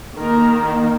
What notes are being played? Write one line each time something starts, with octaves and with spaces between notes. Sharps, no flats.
D#3 A#3 A#4